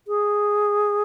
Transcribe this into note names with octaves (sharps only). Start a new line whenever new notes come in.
G#4